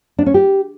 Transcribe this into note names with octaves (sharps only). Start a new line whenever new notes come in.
D4
C#4
G4